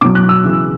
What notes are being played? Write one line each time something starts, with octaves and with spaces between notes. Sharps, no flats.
B2 F#3 D6
F#6
E6
C#3 E3